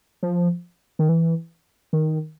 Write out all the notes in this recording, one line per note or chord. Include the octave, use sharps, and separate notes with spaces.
F3
D#3
E3
D#3